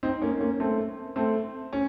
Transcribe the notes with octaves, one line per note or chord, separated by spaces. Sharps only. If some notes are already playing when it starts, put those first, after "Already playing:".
C4 D#4
A#3 C#4
A#3 C#4
A3 C4
A3 C4
C#4